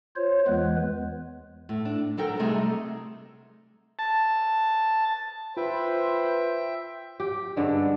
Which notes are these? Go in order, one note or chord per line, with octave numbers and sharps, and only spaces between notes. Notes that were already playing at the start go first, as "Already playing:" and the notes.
F4 C5 C#5
E2 E3 G#3 B3 B4
A2
D4
F#3 A4 A#4 G5
C3 G3 A3 D#4 G#4
A5
F4 B4 C5 E5 G5
G4
G2 D3 G#3